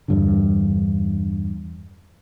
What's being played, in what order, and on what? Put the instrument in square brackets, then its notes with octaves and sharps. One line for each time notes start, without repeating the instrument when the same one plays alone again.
[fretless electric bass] E2 G2 D3